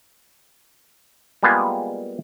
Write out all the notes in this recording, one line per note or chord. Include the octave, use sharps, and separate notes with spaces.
G3 G#3 A#3 B3 F4 G#4